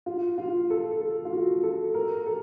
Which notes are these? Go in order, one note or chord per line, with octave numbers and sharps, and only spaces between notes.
F4
F4
A4
A4
F4
F#4
A4
A#4
A4